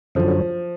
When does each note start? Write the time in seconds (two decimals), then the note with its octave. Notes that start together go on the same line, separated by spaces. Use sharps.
0.15 F#2 D3 F3 F#3